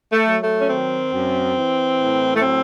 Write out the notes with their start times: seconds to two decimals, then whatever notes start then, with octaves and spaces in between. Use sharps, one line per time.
0.13 A3
0.27 F#3
0.42 A3
0.61 C#4
0.70 D#3 C4
1.12 F#2
1.56 E3
1.99 A2
2.36 A3
2.41 F#3 C4